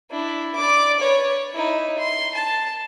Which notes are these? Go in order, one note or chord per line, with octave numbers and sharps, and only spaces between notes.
D4 E4
D5 D6
B4 C#5
D#4 E4
C6
A5